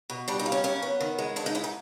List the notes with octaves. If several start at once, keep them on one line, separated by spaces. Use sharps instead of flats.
B2
G3 D4
D#4
A#3
C#4
F#2 C#4
B3
D#3
G#3
G#2 D4
D#4
G#2 E4
D#4